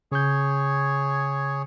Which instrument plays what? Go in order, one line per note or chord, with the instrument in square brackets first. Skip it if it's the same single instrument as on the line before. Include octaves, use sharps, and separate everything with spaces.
[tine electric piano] C#3 G6 [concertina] G#4 C#5